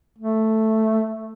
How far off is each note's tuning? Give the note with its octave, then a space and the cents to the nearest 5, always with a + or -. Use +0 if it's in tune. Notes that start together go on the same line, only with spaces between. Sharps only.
A3 +0